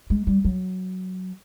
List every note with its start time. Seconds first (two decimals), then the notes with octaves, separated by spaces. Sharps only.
0.10 G#3
0.27 G3
0.45 F#3